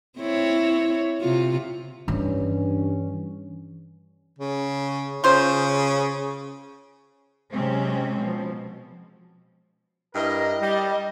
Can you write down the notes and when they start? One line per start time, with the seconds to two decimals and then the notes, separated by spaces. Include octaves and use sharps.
0.18 C4 E4 C#5
1.21 C3 F4
2.08 G2 E3 C#4
4.39 C#3
5.24 C#3 F4 C5
7.52 C3 F#3 G#3 C4 C#4
8.21 B2 F3
10.15 G2 E4 A#4 D#5
10.61 G3